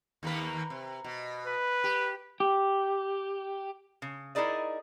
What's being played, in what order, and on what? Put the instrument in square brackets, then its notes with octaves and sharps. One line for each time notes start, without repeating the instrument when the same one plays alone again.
[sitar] D#2 A#3 B4
C3
B2
[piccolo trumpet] B4
[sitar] G4
[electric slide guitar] G4
[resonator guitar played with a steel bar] C#3
D#4 E4 G#4 A#4 D5 D#5